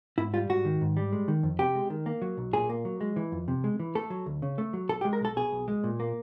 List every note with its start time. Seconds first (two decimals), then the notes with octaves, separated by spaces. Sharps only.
0.18 G#2 E4
0.34 G3 F4
0.49 G#2 F#4
0.65 D#3
0.81 G#2
0.97 G3
1.13 G#3
1.28 D#3
1.43 F2
1.59 C3 G4
1.75 G#3
1.90 D#3
2.06 A#3
2.22 F#3
2.38 B1
2.53 A#2 G#4
2.69 A#3
2.85 F#3
3.01 G#3
3.16 E3
3.32 F2
3.48 C3
3.64 G#3
3.80 E3
3.95 A3 A4
4.10 F#3
4.26 D2
4.42 C#3
4.58 A3
4.73 F#3
4.89 B1 A4
5.01 G4
5.05 G#3
5.13 A#4
5.21 B1 A4
5.36 B2 G#4
5.52 B1
5.68 G#3
5.84 A#2
6.00 A#3